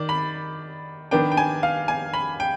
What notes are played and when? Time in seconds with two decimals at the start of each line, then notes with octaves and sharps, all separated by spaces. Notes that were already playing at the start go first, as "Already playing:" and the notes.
Already playing: D#3 D5
0.09 B5
1.11 D#3 B3 D4 G5
1.32 G5
1.37 G#5
1.63 F5
1.88 G#5
2.13 B5
2.40 G5